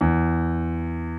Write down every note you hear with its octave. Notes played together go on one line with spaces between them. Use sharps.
E2